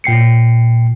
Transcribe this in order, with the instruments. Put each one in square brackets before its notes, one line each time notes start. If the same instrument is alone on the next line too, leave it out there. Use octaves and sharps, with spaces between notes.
[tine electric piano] A#2 G5 C7 C#7